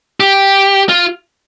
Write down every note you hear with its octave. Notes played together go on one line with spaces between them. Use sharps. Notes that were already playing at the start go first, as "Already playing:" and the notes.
G4
F4